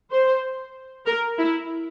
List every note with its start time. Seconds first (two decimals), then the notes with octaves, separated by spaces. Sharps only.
0.11 C5
1.06 A#4
1.38 E4